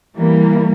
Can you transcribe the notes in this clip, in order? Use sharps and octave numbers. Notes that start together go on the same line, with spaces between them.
E3 G3 A#3